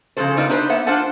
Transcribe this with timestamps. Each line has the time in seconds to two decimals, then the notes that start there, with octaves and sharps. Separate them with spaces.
0.17 C#3 F3 G#3 A4 C5
0.37 B3 D4 D#4 F4 A#4 B4
0.50 D4 D#4 B4 C5
0.69 A#3 B3 E5 F#5
0.87 D4 F4 C5 F#5 A5